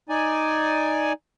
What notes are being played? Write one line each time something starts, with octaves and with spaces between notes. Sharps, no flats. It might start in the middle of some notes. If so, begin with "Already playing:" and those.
D#4 D5 G#5